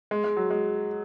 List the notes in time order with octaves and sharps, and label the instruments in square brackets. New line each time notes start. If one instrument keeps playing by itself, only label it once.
[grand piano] G#3
G#3
F#3
G#3